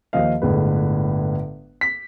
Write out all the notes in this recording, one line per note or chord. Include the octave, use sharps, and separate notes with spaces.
D#2 F3 D#5 F5
G1 A2 G#3 B4
B6